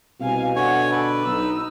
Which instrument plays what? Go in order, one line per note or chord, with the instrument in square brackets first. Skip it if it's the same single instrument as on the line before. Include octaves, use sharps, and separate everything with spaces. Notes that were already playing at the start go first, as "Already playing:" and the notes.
[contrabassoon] C2 [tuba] B2 [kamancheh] F5 G#5
[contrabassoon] D3 [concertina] C#5 G#5 [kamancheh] F#5
[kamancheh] A4 D5 [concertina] B4
[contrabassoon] B1 [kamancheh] D#4 E6